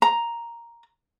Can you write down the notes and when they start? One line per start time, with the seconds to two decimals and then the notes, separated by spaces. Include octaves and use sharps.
0.02 A#5